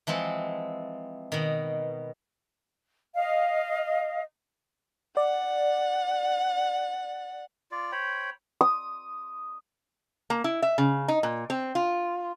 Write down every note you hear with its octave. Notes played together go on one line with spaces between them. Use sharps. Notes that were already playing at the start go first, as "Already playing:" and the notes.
E3 F3 G#3 C4
B2 D#3
D#5 F5
D5 F#5
F4 D5
C5 C#5 G5 B5
D#6
A#3
E4
E5
C#3
D#4
A#2
C4
F4